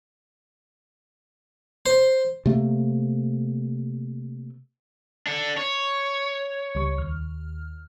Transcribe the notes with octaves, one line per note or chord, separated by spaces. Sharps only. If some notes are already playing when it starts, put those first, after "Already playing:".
C5
C3 A3 A#3
D4 A4
C#5
C#2 G3 C#6
D#2 F6